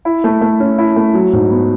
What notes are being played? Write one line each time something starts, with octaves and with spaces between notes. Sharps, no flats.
E4
A3
A3
C#4
E4
A3
F#3
G#2
B3